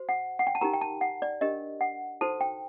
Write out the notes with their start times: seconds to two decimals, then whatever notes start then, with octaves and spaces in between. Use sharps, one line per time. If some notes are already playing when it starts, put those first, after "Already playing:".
Already playing: F#4 C5
0.09 F#5
0.39 F#5
0.47 G5
0.55 A5
0.61 D#4 G4 A#4 A#5
0.74 G5
0.81 A5
1.01 F#5
1.22 D5
1.41 D4 G4 A#4 D#5
1.81 F#5
2.21 D#4 F#4 A4 C5 A5
2.41 G5